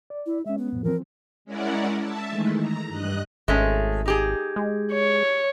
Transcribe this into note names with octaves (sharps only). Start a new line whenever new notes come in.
D5
E4
G#3 C#4 E5
B3
F2 A2 F3
E3 F3 C4 A#4
G#3 C#4 E4 A#4 D5 F#5
E5 A5
D#3 E3 G#3 A3
A#5
G2 D#5 F#6
G#1 G#3 A3 C#4
D#4 G4 G#4
G#3
C#5